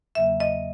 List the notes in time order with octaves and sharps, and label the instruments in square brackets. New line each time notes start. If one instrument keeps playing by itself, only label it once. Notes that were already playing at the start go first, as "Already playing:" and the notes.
[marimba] E2 C#3 F#3 A#3 E5
D#5